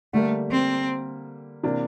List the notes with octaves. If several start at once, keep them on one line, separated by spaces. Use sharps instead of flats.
D3 G3 A3 A#3
C4
C3 E3 A#3 D4